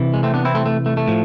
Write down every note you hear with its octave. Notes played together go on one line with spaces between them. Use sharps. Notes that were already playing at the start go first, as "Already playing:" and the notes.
Already playing: C3 E3
G#3
A3 C4
B3 D4
C4 E4
A3 C4
A3
A3
A3
A2 F3